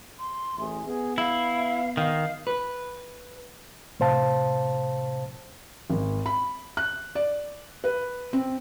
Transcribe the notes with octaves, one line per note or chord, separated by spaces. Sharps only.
C6
A1 E4 G#4
B3 G#4
E4 F5
D#3 F5
B4
A2 C3 C5 F5 A5
G#1
B5
F#6
D5
B4
C4